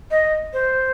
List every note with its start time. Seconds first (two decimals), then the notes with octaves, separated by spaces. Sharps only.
0.11 D#5
0.53 C5